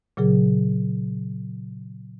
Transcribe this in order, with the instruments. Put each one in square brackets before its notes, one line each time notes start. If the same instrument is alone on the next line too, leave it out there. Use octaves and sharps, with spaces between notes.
[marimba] A#2 C#3 F#3 G#4